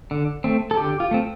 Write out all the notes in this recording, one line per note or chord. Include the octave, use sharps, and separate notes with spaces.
D3
A3 C4
A4
D3 G4
F4
A3 C4